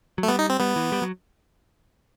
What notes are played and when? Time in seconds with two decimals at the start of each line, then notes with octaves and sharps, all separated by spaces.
0.18 F#3
0.23 A3
0.28 G3 B3
0.39 D#4
0.50 C4
0.60 G3 B3
0.76 E3
0.92 G3
1.02 F#3